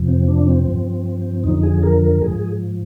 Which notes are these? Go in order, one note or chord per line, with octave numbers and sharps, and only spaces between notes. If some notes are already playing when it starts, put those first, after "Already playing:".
Already playing: F2 C3 F3
C4
D4
C4
G2 F3
F2 D3 F3 D#4
G#4
A#4
A#4
G#2 F3 G#4